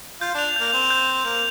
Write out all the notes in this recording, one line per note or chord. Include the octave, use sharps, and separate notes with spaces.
F4 G6
D4 F7
A#3 G6
C4 F7
G6
F7
A#3 F7